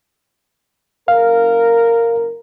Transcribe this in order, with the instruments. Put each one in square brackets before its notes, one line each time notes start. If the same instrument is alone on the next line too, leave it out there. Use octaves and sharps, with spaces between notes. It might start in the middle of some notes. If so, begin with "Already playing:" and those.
[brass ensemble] F#1 A#4 [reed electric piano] F5